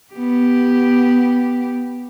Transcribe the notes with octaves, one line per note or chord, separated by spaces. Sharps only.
B3 G4